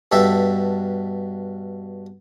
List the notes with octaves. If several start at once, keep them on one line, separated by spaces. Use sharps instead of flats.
G2 B2 G4 A4 E5